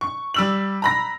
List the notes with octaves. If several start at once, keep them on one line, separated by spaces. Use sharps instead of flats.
C#6
G3 E6 F#7
A#5 B5 A#6